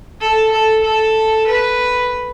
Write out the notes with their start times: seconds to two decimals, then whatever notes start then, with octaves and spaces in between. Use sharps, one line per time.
0.21 A4
0.52 A4
0.83 A4
1.47 B4